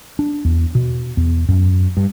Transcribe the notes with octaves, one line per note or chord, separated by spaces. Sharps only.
D4
E2
B2
E2
F#2
G2